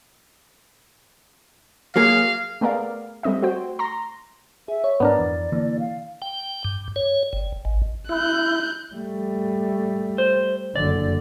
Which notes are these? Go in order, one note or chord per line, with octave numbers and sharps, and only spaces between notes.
F#3 A#3 G#4 F5
A3 B3 G#4 A#4 D5 F5
G3 A3 C4 D#5 E5
A3 F#4 C5 G5
A#5 C6 A#6
G#4 E5
C#5
G#2 G3 B3 D4 A#4 D5
F2 E3
D3 E3 A#3
F5
G5
G2
C#5
G1
G#1
E4 F#6 G6
G3 A3
C5
F#1 D3 D5